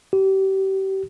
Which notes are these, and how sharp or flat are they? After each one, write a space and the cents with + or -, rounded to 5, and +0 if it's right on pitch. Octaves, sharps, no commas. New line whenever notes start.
G4 -30